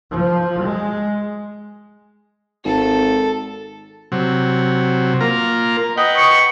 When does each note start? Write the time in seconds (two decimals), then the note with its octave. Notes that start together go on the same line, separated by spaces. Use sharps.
0.11 F3
0.65 G#3
2.65 G#1 A4
4.12 C3 F#3
5.21 A#3 F4 A#4
5.97 B4 D#5 F#5 G5
6.17 C#6